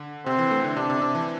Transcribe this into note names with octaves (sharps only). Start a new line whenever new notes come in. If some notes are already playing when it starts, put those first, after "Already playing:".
Already playing: D3
C3 C4
E3
A3
D3
C3 D4
C3
C3
E3